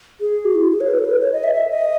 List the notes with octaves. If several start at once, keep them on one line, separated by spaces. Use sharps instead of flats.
G#4
F#4
E4
G#4
C#5
B4
A4
B4
C#5
D#5
E5
E5
D#5